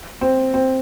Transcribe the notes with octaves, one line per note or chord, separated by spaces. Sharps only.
C4
C4